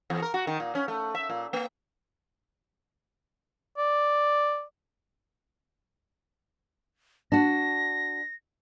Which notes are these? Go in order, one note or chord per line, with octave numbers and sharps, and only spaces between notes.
E2
A#4
F#4
D#3
A#2
C#4
A3
E5
A#2
A#3
D5
D4 F#4 A#6